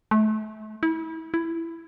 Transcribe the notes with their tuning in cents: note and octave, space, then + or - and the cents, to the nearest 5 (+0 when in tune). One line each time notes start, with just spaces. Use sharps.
A3 -30
E4 -30
E4 +10